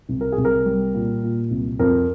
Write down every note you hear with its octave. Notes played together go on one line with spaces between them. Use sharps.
C2
A#4
G#4
C2
A#4
G3
A#2
A#2
C2
F2 A#4